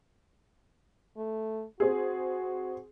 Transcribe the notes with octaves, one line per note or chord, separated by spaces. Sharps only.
A3
C4 F#4 G#4